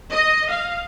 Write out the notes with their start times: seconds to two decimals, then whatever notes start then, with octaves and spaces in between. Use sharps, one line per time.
0.11 D#5
0.50 F5